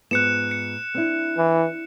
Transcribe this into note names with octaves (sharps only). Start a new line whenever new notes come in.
G#2 B3 F4 F#6 C#7 E7
C#7
C4 D4 E4
E3